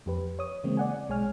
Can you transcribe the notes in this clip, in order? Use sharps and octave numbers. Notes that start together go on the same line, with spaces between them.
F2 G4 B4
C#5 D#6
C#3 E3 G#3 A#3 C4
D5 F#5 G#5
B1 G#3 C#5 G#5 F6